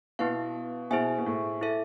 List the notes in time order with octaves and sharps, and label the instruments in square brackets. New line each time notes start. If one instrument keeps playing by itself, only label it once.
[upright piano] B2 [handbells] B3 E4 B4 F5
[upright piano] B2 [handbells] E4 G#4 C5 E5 G#5
[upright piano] B2
A2
[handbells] E4 A4 E5